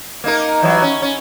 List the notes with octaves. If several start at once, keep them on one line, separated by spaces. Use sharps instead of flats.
A#3 D#4 A#4
E3 F#3 G3
C#4
C#4